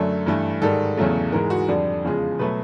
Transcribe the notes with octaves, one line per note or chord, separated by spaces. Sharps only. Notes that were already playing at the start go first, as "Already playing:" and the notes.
Already playing: F#2 D3 F#3 A3 A4
G2 E3 A3
G#2 D#3 G3 A4
E2 C#3 F#3 A3
G#2 E3 G#3 A#4
F#4
F2 D3 G3
E2 C#3 F3 G#3
B2 F#3 A3 B4